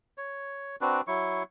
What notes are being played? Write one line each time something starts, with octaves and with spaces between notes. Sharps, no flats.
C#5
C4 D4 F#4 B4
F#3 E4 C#6